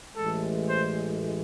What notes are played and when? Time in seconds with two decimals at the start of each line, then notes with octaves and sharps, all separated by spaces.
0.16 A1 A2 E3 G#3 A4
0.69 C5